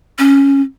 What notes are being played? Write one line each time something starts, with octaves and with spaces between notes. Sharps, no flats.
C#4